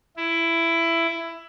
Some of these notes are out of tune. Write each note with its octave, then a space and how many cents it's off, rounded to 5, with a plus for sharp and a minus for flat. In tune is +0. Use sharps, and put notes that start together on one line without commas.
E4 +15